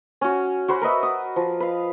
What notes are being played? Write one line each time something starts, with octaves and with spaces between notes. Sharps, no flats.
C#4 F#4
F#4 C5 B5
A#4 B4 D#5 E5
D#6
F3
B4 F5